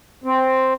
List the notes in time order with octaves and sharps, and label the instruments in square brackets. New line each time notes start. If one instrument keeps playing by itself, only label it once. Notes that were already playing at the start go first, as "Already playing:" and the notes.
[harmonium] C4